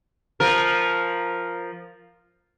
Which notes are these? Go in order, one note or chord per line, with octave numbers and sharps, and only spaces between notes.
F3 A#4